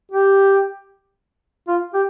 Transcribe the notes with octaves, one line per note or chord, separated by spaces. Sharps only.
G4
F4
G4